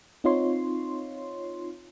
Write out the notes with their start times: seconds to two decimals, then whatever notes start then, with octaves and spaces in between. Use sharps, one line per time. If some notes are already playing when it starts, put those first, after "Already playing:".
0.24 C4 D#4 F4 C#5 C6